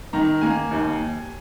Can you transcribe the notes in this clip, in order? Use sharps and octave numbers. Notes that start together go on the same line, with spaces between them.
D#3 A#5
A#3 G#5
D#2